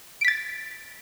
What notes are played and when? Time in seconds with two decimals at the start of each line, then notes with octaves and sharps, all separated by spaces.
0.21 D7
0.25 B6
0.28 A6